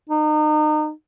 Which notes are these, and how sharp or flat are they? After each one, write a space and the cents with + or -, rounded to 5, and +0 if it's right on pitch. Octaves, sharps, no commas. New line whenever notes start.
D#4 -35